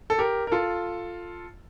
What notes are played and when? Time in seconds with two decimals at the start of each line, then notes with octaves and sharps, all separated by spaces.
0.10 A4
0.19 G4 A#4
0.47 A#4
0.52 F4 A4